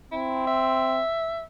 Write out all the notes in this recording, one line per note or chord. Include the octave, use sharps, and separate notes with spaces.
C4 E4
E5